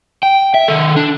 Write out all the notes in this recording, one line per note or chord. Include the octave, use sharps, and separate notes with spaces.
G5
E5
D#3 A4
D4